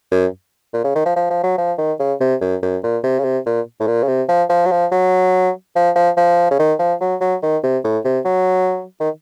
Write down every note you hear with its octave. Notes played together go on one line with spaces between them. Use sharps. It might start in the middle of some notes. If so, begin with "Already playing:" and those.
F#2
A#2
C#3
D#3
F3
F3
F3
F#3
F3
D#3
C#3
C3
F#2
F#2
A#2
C3
C#3
C3
A#2
A2
A#2
C#3
C3
F3
F3
F#3
F3
F#3
F3
F3
F3
C#3
D#3
F3
F#3
F#3
D#3
C3
A2
C3
F#3
D#3